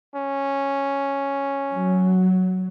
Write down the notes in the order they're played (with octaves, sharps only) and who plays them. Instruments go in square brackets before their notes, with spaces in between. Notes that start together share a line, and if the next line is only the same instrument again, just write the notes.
[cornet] C#4
[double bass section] F#3